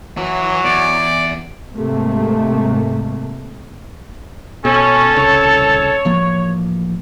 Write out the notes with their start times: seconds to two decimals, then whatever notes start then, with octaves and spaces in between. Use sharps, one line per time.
0.17 E3 F#3
0.65 E2 D5
1.75 G#2 C3 A3 A#3
4.65 B2 C#4 A4
5.16 D#1 C2 C#3 C#5
6.05 A1 F3 A#3